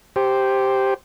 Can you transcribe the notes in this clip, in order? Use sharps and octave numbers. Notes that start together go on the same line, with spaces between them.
G4 C5